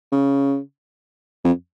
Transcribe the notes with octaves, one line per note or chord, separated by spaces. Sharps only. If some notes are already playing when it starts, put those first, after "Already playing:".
C#3
F2